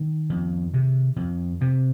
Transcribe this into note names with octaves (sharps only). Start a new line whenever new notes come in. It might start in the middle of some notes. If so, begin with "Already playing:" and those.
Already playing: D#3
F2
C3
F2
C3